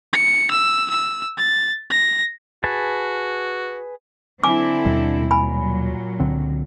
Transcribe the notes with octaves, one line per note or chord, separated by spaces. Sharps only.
C#7
E6
E6
A6
A#6
F#4 G#4 B4 A5
D3 C4 E4 G#5 D6
D#2 B2 G3
A#2 F#3 G#5 B5
C#2 D3 C4